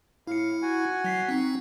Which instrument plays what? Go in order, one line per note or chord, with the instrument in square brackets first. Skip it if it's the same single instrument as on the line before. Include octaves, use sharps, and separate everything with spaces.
[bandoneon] A2 F5 [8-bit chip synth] E4 C#7
[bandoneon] F#4 F#5 G#5
[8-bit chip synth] F#3 B6 C7
C4 D#4